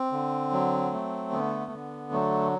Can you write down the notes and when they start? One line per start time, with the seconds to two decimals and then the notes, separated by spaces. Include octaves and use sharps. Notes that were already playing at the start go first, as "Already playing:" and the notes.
Already playing: C4
0.12 D3
0.52 F#3
0.92 A3
1.31 D3 B3
1.72 D3
2.12 F#3 A3